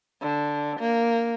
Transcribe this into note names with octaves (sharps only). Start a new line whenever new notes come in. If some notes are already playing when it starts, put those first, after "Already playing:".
D3
A#3